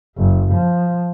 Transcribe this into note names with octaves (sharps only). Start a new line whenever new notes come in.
F#1
F3